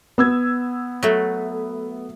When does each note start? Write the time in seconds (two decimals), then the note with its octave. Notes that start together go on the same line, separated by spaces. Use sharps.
0.18 B3 E6 G#6
1.03 F#3 A3